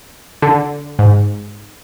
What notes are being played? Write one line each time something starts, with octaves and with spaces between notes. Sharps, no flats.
D3
G#2